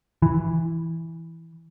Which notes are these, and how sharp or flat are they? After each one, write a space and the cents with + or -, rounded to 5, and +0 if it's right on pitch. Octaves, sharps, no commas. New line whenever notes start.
E3 -5